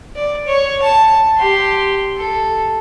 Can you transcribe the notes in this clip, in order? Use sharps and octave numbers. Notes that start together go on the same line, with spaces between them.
D5
C#5
A5
G4 C6
A4